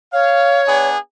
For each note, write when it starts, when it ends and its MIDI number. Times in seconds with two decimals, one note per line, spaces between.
0.13 0.88 73
0.13 0.59 77
0.67 0.97 59
0.67 0.97 62
0.67 0.97 68